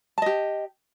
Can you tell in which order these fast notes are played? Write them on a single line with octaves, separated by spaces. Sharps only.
A5 D#5 G4